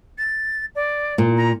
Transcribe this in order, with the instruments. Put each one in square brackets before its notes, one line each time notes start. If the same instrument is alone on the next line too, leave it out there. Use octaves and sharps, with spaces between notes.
[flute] A6
D5
[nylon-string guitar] A#2
[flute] A#5